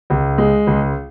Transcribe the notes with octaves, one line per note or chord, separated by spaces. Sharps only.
C#2
G#3
C#2